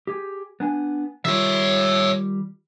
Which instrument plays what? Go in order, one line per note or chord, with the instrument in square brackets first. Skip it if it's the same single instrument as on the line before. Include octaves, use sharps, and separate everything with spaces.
[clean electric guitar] G4 G#4
B3 D4 G#5
[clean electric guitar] D#3 G3 F4 [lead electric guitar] C#5 E5